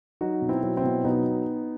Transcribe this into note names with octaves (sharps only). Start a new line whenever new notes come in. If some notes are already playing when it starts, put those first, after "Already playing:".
F#3 D#4 F#4
B2
C4 E4
F#3
C4 E4
B2
F#3 B3 D#4